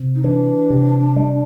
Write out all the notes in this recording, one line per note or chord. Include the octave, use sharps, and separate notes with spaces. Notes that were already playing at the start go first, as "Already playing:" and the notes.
Already playing: C3
D#4
E3 D4
C3
G3